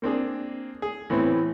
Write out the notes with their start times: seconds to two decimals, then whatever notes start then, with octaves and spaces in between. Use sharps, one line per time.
0.02 A#3 C4 D4 G#4
0.82 G#4
1.10 A2 E3 B3 C4